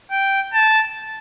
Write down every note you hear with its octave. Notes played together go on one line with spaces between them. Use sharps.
G5
A5